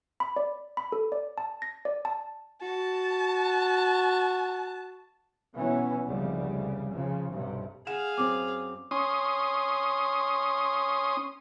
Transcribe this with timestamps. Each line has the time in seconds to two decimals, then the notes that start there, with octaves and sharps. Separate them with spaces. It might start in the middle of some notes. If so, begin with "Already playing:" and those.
0.20 B5
0.36 D5
0.77 B5
0.92 A4
1.12 D5
1.38 A5
1.62 A#6
1.85 D5
2.05 A5
2.62 F#4 A5
5.55 B2 E3 F#3 B3 C#4
6.07 F1 C#2 C#3 G3
6.94 C#3 F3
7.31 B1 G2 C3
7.87 G#4 F5 F#5 E7
8.18 F#2 C4 C5 D6
8.91 C#4 C6 D#6